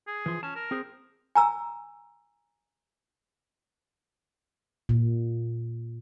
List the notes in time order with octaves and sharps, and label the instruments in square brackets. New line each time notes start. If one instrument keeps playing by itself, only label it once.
[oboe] G#4
[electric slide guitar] E3 F3
[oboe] C#4 [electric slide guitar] A5
[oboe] A#4
[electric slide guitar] C4 G#4 C5
[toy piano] G#5 A#5 E6
[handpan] A#2